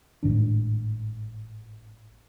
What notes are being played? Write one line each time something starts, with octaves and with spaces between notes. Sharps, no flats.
G#1 A2 D#3 D4